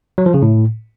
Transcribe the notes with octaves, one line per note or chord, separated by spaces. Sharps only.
F#3
F3
C#3
A2